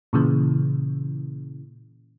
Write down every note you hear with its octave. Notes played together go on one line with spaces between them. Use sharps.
A#2 C#3 E3